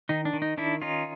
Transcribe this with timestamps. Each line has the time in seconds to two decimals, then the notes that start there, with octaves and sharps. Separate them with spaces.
0.09 D#3 D#4
0.25 D4
0.33 D#3
0.42 D#4
0.57 D#3 D4 E4
0.82 C#4 D#4 F4